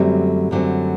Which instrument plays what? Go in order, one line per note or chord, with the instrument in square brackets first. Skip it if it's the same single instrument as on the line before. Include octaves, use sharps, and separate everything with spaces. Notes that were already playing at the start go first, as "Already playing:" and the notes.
Already playing: [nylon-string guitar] F#2 D3 F#3 A3 C4 [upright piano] G3
[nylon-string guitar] F#2 D3 F#3 A3 C4